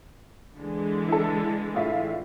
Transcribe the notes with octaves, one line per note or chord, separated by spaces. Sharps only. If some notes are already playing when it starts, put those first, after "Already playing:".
D3 E3 G#3
E4 A4
A2 F4 E5